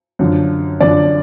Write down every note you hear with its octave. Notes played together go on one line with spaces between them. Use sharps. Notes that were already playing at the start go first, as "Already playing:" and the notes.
F#2 D3 F3
F#2 D3 F3 D5